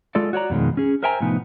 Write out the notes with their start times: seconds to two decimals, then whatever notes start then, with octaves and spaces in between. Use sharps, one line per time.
0.15 G#3 F4 A4 D5
0.33 F#4 C#5 D5 A#5
0.50 F2 B2 D#3 G#3
0.77 C#4 G#4
1.03 A#4 C5 E5 G5 G#5 A#5
1.20 A2 C3 F3 B3 D#4